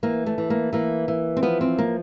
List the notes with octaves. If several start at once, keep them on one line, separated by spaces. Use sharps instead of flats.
E3 A#3
A3
E3
A#3
E3 A#3
E3
C4
F3 B3
C4
A#3